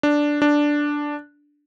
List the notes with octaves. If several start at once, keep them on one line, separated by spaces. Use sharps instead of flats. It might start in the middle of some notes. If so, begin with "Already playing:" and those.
D4
D4